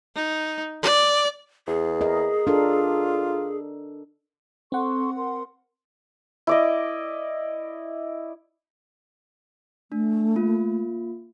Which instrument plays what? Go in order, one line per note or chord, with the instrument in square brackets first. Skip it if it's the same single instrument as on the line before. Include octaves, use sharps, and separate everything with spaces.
[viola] D#4
D5
[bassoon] E2 [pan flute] G#4
[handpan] A#4 D#5
[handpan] D4 A4 A#4 [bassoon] F4
[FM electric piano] C4 F#5 [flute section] A4 C6 C#6
[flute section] A#4 C6
[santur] E4 D5 D#5
[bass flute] A3 [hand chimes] D4
[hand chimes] A#3 F4